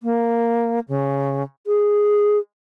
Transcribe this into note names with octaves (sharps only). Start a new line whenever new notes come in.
A#3
C#3
G#4